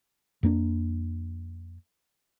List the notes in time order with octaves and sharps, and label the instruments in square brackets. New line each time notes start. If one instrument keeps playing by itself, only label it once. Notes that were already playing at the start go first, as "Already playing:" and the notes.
[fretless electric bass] F2 A#3 D4